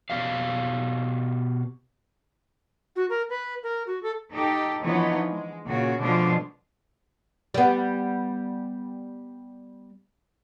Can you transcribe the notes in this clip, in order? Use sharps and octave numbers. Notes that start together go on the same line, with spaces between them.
B2 G4 D5 F5
F#4
A#4
B4
A#4
F#4
A4
D#4 G4 A4
D3 E3 F3 B3 D#4 C#5
G#3
A#2 C#3 F#4
B2 D3 F3 G#3 D4 F4
G3 B3